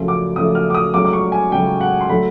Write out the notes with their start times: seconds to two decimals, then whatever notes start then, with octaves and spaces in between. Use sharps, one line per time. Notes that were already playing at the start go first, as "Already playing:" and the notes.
Already playing: F#2 C#3 F3 A3
0.08 D6
0.36 F#2 C#3 F3 A3 D#6
0.55 F6
0.70 D6
0.75 D#6
0.94 C#2 C#3 F#3 A3 D6
1.05 D6
1.13 C#6
1.32 G#5
1.52 C#2 C#3 F#3 A3 G5
1.81 F#5
2.01 C6
2.09 D3 F#3 A3 B5